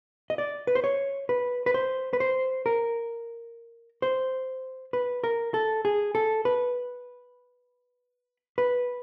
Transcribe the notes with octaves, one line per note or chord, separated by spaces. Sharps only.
D#5
D5
B4
C5
C#5
B4
B4
C5
B4
C5
A#4
C5
B4
A#4
A4
G#4
A4
B4
B4